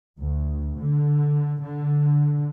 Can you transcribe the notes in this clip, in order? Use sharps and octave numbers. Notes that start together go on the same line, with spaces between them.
D2
D3
D3